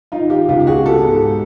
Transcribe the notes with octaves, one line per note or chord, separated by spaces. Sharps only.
D#4 F4
D#3
F4 G4
C#2 F4 G4
G4
F#4 G#4
B2
G4 A4
G#2